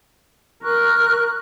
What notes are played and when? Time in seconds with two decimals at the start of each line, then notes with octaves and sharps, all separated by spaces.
0.63 A#4 C#6 F6 F#6